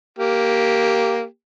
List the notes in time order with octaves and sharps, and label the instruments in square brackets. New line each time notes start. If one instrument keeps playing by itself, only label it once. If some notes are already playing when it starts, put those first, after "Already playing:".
[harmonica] A#3 G4